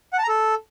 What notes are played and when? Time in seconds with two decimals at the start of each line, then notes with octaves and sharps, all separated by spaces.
0.13 F#5
0.18 A5
0.23 A#5
0.29 A4